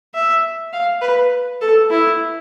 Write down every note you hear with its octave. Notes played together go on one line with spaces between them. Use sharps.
E5
F5
B4
A4
E4